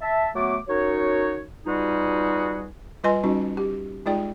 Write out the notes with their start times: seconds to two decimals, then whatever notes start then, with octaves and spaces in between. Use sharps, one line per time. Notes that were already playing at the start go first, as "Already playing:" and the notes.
0.01 E5 A5
0.35 F#3 A3 B3 D6
0.68 F#2 D#4 F#4 C#5
1.66 B2 G3 D#4 F4 F#4 G#4
3.04 G3 F4 B4 D#5 G#5 C6
3.24 G3 C#4 D#4 F#4
3.57 G4
4.06 G#3 D#4 F4 G#4 D5 G5